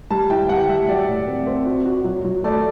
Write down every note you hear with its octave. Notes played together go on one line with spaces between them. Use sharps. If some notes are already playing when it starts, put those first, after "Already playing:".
G3 A5
E4 G5
G3 F#5
G3 E5
F#3 D5
A2
C4
C4
F#4
F#4
F#3
F#3
A3 D5